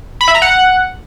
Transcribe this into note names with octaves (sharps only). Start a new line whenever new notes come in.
B5
E5
A#5
F#5